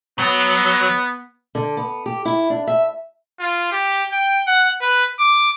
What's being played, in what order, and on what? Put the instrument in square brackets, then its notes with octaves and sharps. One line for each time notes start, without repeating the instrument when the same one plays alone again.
[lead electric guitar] F#3 [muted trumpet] B3
[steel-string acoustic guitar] D3
B3
G4
E4
D4
E5
[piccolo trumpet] F4
G4
G5
F#5
B4
D6